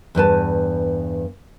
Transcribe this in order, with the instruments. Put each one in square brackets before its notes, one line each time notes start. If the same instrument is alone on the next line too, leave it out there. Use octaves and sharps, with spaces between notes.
[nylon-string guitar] E2 G2 B4 A5